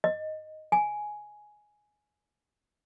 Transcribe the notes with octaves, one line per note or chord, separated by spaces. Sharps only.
D#5
G#5